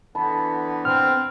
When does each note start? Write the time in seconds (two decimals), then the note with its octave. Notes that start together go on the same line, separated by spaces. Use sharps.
0.15 D3 E3 B3 A5 B5
0.85 C4 F6